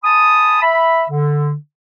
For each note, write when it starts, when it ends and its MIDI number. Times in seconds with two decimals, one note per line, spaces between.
0.04 0.61 80
0.04 0.61 81
0.04 0.61 83
0.04 0.61 87
0.62 1.05 76
0.62 1.05 83
1.10 1.55 50